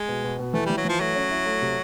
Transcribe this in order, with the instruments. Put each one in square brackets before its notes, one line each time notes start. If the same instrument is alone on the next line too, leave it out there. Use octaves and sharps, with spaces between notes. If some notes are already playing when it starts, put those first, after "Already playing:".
Already playing: [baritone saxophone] G#3
[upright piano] B2
B2
B2
[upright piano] E3 [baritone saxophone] A3
[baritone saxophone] G3
[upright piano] E3
[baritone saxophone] F#3
[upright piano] E3 [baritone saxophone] F3
[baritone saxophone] F#3 [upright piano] A3
[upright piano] C#4
E4
A3
C3